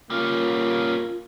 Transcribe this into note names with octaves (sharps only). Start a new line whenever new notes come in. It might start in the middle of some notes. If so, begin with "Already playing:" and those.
G3 A#3 C#4 F4